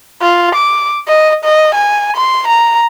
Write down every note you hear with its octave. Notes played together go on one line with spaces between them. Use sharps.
F4
D6
D#5
D#5
G#5
C6
A#5